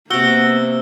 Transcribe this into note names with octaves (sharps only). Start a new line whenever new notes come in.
C3 A#3 B3 F#4 G5 E6 G7